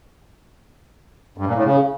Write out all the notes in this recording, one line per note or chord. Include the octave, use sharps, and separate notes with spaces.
G2
A#2
A2
C#3